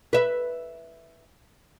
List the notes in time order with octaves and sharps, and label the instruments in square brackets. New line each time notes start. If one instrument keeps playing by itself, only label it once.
[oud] B4 E5